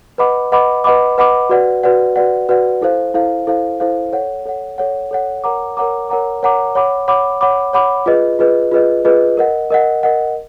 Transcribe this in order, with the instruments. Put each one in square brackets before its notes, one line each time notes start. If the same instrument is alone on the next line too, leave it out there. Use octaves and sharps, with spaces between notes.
[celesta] B4 D#5 F#5 B5 D6
B4 D#5 F#5 B5 D6
B4 D#5 F#5 B5 D6
B4 D#5 F#5 B5 D6
F#4 B4 D5 F#5
F#4 B4 D5 F#5
F#4 B4 D5 F#5
F#4 B4 D5 F#5
E4 A4 C5 F5
E4 A4 C5 F5
E4 A4 C5 F5
E4 A4 C5 F5
A4 C#5 F#5
A4 C#5 F#5
A4 C#5 F#5
A4 C#5 F#5
A#4 C#5 F#5 A#5 D6
A#4 C#5 F#5 A#5 D6
A#4 C#5 F#5 A#5 D6
A#4 C#5 F#5 A#5 D6
C#5 F#5 B5 D6
C#5 F#5 B5 D6
C#5 F#5 B5 D6
C#5 F#5 B5 D6
F4 G#4 B4 D#5
F4 G#4 B4 D#5
F4 G#4 B4 D#5
F4 G#4 B4 D#5
A#4 D#5 F#5
A#4 D#5 F#5
A#4 D#5 F#5